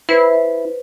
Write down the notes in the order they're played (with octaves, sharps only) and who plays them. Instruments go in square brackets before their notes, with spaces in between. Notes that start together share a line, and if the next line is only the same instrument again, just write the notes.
[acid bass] E4 [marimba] B4 C5